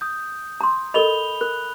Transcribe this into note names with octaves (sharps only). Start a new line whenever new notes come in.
D#6 G6
A#5 C6
A4 A#4 D#5 B5 F7 G7
A#4 F#6